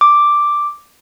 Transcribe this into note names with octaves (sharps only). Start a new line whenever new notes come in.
D6